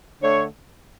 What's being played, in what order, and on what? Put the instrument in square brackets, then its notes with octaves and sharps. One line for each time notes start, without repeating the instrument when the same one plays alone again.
[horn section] D3 A3 D4 C#5